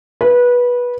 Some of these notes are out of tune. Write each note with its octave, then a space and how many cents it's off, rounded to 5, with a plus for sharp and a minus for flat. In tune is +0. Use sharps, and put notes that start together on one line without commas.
B4 -20